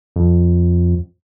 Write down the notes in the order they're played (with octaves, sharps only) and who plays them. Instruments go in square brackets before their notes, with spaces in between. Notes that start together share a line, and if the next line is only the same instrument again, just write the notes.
[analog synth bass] F2